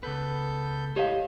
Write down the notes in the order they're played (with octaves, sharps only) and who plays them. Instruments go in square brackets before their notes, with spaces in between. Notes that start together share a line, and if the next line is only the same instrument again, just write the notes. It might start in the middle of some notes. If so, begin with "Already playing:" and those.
[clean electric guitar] C#2 B4 [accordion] B3 A4 G6
[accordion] A2 [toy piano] G4 F5 [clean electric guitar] C5 C#5 D#5